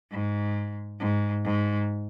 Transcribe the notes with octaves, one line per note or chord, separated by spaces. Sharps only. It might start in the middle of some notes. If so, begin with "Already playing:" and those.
G#2
G#2
G#2